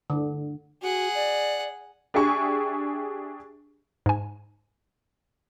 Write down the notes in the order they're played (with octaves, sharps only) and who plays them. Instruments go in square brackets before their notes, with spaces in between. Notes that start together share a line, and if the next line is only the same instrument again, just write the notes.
[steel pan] D3
[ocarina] F#4 [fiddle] G#4 F#5
[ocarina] D5
[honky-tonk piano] D4 G4 G#4 E5 G#5 C#6
[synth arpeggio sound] G#2 G#5